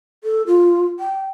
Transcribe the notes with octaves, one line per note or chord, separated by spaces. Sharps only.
A4
F4
G5